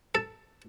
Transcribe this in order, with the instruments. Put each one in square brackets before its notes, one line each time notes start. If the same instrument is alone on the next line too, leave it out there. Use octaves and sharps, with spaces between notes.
[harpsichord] A4